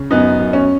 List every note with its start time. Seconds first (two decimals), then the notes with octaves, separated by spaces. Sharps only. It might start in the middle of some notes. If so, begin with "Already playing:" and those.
Already playing: C#3
0.11 F#2 B3 D#4
0.39 F#2
0.53 C#4